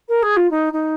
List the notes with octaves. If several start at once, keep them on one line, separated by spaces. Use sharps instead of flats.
A#4
G#4
F4
D#4
D#4